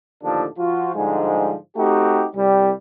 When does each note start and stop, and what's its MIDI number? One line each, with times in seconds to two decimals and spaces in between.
0.23 0.46 39
0.23 0.46 45
0.23 0.46 50
0.23 0.46 53
0.23 0.46 62
0.23 0.46 69
0.58 0.91 53
0.58 0.91 65
0.58 0.91 66
0.95 1.55 44
0.95 1.55 50
0.95 1.55 53
0.95 1.55 55
0.95 1.55 56
1.77 2.25 57
1.77 2.25 60
1.77 2.25 63
1.77 2.25 66
1.77 2.25 67
2.35 2.71 36
2.35 2.71 55